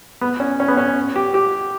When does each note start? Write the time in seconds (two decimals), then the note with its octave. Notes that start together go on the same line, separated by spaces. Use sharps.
0.21 B3
0.40 C#4
0.60 C#4
0.68 B3
0.77 C#4
1.16 G4
1.34 G4